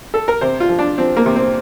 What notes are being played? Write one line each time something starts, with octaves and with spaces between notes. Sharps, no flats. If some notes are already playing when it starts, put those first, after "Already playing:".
A4
A#4
C3 C5
F4
F3
D4
F3 C4
A#3
C3
C4